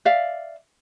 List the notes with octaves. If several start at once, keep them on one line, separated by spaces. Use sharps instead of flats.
D5 E5 F5